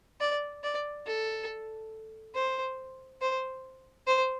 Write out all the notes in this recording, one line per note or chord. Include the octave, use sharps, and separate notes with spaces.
D5
D5
A4
C5
C5
C5